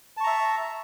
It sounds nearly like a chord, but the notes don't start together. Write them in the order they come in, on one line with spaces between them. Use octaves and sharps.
A5 C#6 A#5 E5